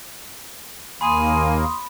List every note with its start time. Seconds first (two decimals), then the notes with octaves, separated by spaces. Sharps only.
1.01 D#2 A#3 G#5 B5 C6 D#6